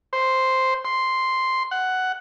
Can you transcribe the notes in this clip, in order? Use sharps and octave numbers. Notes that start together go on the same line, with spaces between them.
C5
C6
F#5